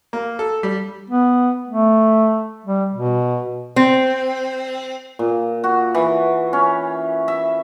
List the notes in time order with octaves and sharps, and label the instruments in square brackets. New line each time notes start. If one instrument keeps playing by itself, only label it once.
[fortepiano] A#3
A4
G3
[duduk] B3
A3
G3
B2
[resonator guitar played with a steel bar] C4
[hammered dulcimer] A#2
F#4
E3
C#4
E5